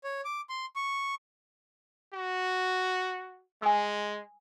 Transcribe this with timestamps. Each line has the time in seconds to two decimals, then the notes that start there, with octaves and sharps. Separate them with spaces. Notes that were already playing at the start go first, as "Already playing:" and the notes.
0.04 C#5
0.25 D6
0.49 C6
0.76 C#6
2.13 F#4
3.62 G#3 G#5 D#6 E6